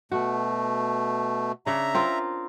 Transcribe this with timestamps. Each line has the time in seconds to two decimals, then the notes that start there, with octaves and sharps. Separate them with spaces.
0.12 B2 A3 F#4
1.66 C#3 D4 E5 A#5
1.94 C4 F4 A#4